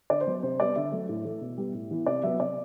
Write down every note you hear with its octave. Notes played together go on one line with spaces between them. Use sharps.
D3 D5
C5
F#3 B3
C3 C5
G3 B3 D5
D3 E5
F#3 A3
A2
E3 A3
B2
G3 B3
A2
E3 B3
C3 D5
F#3 B3 E5
C3 D5